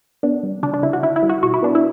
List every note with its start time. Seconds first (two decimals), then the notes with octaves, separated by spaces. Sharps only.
0.23 B3 D4
0.43 G3
0.63 C#3 D4
0.74 D4
0.83 C#3 E4
0.93 F#4
1.03 D3 E4
1.16 E4
1.23 G3
1.29 F#4
1.43 B2 F#4
1.54 E4
1.63 B3 D4
1.75 E4